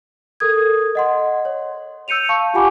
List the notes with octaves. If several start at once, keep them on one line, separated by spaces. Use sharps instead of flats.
A4 A#4 D#6 G#6
D#5 F#5 C6
C#5
E6 G6 C#7 D#7 F7
F5 A5 C#6
F4 G4 F#5 G#5 B5 D6